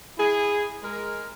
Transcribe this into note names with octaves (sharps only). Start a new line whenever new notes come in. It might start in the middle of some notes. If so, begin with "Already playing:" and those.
E4 G#4
G#3 A#4